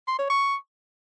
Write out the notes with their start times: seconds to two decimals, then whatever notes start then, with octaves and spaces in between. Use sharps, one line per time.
0.08 C6
0.19 C#5
0.30 C#6